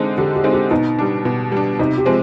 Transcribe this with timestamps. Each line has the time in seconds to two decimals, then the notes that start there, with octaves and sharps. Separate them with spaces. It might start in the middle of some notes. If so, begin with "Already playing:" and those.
Already playing: D3 G#3 C4 D#4
0.18 D3 G4
0.35 G4
0.44 G#3 C4 D#4
0.53 G4
0.71 B2 D#4
0.99 G3 D4
1.25 B2
1.52 G3 D4
1.79 C3 D#4
1.97 G4
2.06 F3 G#3 C4